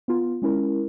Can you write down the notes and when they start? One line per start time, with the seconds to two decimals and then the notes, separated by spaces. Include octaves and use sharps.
0.08 B3 F4
0.42 G#3 C#4 E4 A#4